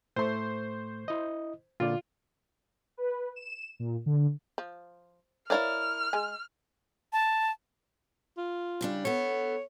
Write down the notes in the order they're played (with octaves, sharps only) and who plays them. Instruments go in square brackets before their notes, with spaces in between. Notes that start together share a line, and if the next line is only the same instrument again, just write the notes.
[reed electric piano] A2 A3 C#6 [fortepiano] C5 C6
[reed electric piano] E4 D#5
[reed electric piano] A#2 D3 D5 [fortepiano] F4
[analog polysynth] B4
E7
A#2
D3
[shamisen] F3
[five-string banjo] E4 A#4 D5 [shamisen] B4 C#5 F5 [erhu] F6
[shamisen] G#3 G#5
[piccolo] A5
[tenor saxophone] F4
[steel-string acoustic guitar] C#3 G3 D4
[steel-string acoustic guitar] B3 A4 [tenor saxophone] C#5